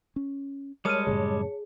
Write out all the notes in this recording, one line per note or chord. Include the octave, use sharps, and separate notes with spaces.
C#4
G3 G#3 A#4 C#5 A5 F6 D#7
F#2 A2 C#3 G#4